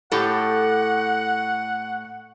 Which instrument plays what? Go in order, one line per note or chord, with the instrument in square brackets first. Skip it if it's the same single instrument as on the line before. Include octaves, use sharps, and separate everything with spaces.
[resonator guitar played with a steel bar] A2 G4 A4 [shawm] F#5